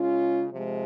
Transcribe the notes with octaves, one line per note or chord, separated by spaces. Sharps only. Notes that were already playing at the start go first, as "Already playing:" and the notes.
Already playing: C#3 G#3 C#4 F4
C3 F3 G#3